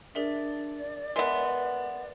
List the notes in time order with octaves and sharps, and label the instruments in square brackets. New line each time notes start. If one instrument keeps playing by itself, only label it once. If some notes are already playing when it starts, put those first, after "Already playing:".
[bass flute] D4 [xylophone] G#4 A#4 E5 [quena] D5
[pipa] G#3 B3 [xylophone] A#4 E5 [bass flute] B4